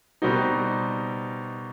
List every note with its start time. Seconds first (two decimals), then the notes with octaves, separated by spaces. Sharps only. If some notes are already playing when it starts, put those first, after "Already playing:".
0.22 B2 G3 C4 D#4